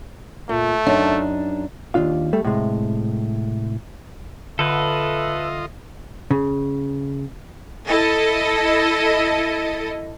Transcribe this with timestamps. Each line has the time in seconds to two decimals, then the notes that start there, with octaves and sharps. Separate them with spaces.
0.49 A#2 A3
0.86 F#2 D4 D#4
1.94 D#2 C3 D4 F4 F5
2.33 G3 A3 A4
2.44 A2 C3 G#3
4.59 D3 F4 A4 B4 D#5 E5
6.31 C#3
7.88 E4 A4 D#5